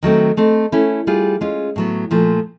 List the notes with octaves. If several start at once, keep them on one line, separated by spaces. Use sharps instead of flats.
D#3 F#3 A3 C4
A3 C4 D#4
A3 C#4 E4
G3 C4 F4 G#4
G#3 C#4 F4
A2 F#3 B3
A#2 F3 A3